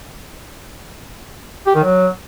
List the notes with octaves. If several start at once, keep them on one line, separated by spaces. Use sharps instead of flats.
G4
D#3
F#3